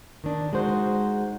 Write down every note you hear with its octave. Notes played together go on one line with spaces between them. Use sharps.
D#3 D4
G#3 D#4 F#4 C5